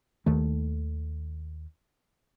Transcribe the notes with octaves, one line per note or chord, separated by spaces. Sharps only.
D#2 D#3 A3